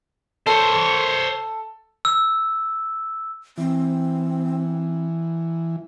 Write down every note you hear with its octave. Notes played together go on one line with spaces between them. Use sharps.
A4 C5 C#5
E6
E3 C4